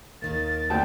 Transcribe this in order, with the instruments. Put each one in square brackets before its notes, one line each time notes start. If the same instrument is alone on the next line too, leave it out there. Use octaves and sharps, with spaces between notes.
[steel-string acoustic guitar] D#2 D#3 A#3 [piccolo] A6
[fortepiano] D2 G5 A5